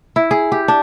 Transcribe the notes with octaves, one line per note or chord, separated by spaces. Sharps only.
E4
G#4
G4
D4